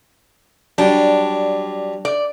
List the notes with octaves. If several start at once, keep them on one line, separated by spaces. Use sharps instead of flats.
F#3 G3 D4
D5